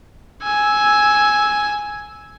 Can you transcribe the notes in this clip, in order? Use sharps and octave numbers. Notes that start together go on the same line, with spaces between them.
G#5 E6